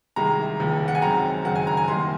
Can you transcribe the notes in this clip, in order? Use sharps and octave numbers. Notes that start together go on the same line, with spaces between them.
C2 C3 D#3 G#3 A#5
F1 D#2 C#3 F3
F#5
G#5
F#2 D#3 G#3 C4 A#5
F#1 F#2 D#3 G#3 F#5
G#5
A#5
G#5
C2 C3 D#3 A#3 C6